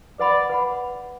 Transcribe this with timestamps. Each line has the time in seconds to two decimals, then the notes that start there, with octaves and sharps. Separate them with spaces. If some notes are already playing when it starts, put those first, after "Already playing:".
0.19 B4 D5 F#5 B5
0.50 B4 F#5 B5